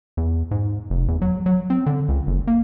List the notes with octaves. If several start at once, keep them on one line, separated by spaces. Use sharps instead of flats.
E2
G#2
F1
E2
F#3
F#3
C4
D3
C#2
F#1
A#3